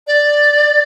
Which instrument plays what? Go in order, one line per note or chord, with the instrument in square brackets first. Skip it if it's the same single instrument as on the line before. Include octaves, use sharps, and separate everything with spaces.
[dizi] D5